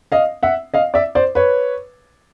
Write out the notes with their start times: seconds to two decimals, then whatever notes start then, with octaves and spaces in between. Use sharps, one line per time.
0.12 D#5 F5
0.43 E5 F#5
0.74 D#5 F5
0.94 D5 E5
1.15 C5 D5
1.35 B4 C#5